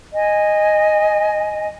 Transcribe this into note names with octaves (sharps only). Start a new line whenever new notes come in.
D#5 G#5